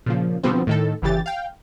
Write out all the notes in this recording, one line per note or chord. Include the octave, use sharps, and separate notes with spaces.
A#2 C#3 F3
B2 D3 F3 G3 B3 C4
A2 D#3 A4
G1 C#3 E3 G4 A6
F5 G5